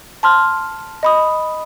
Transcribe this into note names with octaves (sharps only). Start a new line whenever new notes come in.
A5 C6 F6
D#5 B5 D#6